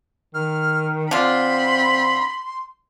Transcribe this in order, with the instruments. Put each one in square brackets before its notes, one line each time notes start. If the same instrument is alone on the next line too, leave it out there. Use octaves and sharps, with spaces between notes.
[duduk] D#3 [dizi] F6
[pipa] D3 F4 [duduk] C4 [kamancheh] B5 [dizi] C6